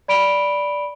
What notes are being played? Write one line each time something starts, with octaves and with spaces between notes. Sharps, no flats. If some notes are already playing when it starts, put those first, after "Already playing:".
D5 B5 D7 F7 G7